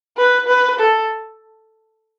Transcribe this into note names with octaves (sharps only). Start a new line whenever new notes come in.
B4
B4
A4